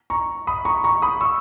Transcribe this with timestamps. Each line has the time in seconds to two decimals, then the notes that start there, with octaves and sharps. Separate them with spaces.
0.10 A#5 C#6
0.47 B5 D#6
0.65 A#5 C#6
0.84 A#5 C#6
1.02 B5 D#6
1.21 C#6 E6